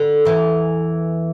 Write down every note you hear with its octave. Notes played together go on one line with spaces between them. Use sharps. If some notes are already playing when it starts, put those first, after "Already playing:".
Already playing: D3
E2 E3